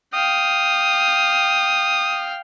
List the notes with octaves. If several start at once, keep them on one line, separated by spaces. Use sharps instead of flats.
F5 G5 D#6